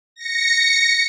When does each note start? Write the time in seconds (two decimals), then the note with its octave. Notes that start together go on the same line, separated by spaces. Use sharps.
0.15 A#6 C#7